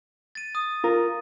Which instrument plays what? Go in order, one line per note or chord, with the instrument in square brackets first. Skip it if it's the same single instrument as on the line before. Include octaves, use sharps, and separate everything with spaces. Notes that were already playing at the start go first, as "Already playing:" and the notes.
[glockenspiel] A6 D#7
D#6
[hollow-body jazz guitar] F4 A#4